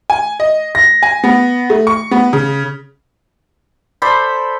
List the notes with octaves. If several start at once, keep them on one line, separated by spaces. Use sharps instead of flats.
G#5
D#5
A#6
G#5
B3
A3
C#6
B3
C#3
A4 C5 D5 B5